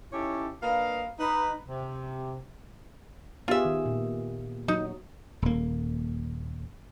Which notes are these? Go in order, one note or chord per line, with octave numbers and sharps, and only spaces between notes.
C#4 D#4 E4 G4 A4 C#5
A#3 D4 B4 D#5 F5
D#4 B4
C3
B3 F4 G4 G#4 E5
D#3
A#2
F#3 D#4
D#1 A#3